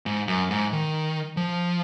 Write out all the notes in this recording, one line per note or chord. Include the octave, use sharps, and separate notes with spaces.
G#2
F#2
G#2
D#3
F3